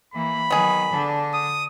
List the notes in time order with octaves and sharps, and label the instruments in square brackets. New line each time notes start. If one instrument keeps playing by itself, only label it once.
[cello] E3 A#3 [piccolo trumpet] B5
[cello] D#3 F#3 [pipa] B3 G#4
[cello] D3 D4
[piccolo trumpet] D#6